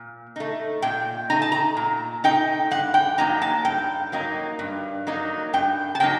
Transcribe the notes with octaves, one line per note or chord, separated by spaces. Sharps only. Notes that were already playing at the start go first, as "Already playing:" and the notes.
Already playing: A#2
A3 D#4
A#2 G5
A3 D#4 A#5
A5
A#5
A#2
A3 D#4 G5
G2 F#5
G5
F#3 A#3 D#4 A#5
A5
G2 G5
F#3 A#3 D#4
G2
F#3 A#3 D#4
G2 G5
A5
F#3 A#3 D#4 G5